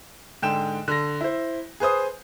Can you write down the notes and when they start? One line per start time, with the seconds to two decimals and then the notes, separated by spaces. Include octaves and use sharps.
0.42 G#2 D3 G5 E7
0.88 D3 A#6
1.21 E4 C5
1.80 G#4 B4 C5 D#6